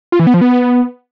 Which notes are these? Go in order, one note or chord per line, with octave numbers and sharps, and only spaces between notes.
F4
E3
B3
F3
B3